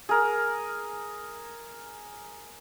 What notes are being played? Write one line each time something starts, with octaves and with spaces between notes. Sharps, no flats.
G#4 A#4